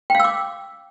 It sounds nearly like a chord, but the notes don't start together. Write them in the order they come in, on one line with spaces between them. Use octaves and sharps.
G5 F5 E6 D6